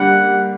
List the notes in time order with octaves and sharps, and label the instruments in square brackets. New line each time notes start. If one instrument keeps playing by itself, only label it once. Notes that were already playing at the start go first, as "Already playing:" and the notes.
Already playing: [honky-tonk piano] D3 G3 A#3 [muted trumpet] F#5